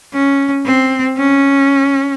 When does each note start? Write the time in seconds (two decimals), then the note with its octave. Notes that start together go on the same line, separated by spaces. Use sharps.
0.14 C#4
0.66 C4
1.18 C#4